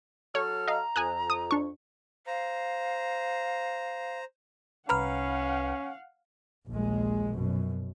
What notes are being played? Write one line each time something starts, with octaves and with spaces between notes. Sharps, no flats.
F#3 A4 C#5 F6
D#5 F5 A#5
F2 G#5 D#6 F#6
D#6
D4 C#6
C5 F5 A#5
C2 C#4 B4 F5 F#5 A#5 B5 F6
A#1 D#2 G#3
F#2 B2